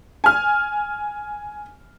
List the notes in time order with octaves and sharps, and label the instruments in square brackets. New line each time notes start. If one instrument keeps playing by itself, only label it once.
[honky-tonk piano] G#5 F6